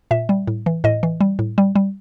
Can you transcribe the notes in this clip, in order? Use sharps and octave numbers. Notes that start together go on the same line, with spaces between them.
A#2 E5
G3
A2
E3
A2 D#5
E3
G3
A2
G3
G3